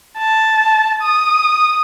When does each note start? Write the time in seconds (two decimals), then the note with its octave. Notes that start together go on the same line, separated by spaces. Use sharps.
0.18 A5
1.02 D#6